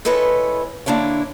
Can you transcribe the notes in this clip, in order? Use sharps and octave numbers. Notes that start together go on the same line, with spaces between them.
G#3 E4 A4 B4 C#5 D#5
D3 A#3 D4 E4 C#5